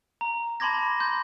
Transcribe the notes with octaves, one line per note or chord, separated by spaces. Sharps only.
A#5
A5 B5 C6 D6 G#6 A#6
C6 G6